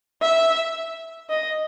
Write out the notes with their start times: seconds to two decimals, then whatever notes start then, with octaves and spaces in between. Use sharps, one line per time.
0.21 E5
1.30 D#5